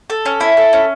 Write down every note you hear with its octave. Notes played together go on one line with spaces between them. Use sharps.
A4
C#4
E4
A4
C#4